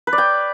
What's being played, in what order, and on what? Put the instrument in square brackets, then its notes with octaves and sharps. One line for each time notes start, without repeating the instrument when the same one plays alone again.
[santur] B4
D5
G5